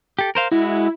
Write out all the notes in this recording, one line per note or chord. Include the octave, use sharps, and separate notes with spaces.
G4 A4
A#4 C5 F5
G#3 E4 F#4